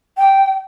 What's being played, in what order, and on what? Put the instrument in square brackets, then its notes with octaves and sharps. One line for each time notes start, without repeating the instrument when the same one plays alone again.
[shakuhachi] G5